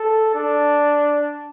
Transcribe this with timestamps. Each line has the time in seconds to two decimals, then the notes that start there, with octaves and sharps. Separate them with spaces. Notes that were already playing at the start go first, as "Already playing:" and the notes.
Already playing: A4
0.35 D4